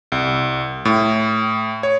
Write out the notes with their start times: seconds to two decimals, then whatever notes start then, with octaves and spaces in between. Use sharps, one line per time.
0.12 C2
0.85 A2
1.83 C#5